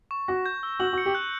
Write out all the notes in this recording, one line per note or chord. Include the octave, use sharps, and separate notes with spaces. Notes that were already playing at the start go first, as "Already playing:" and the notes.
C#6
F#4 A#6
G6
E6
F#4 F#7
F#4
C#7
G4
F#6